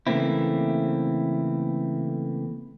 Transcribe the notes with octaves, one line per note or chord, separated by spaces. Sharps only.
C#3 E3 A3 A#3 C4 E4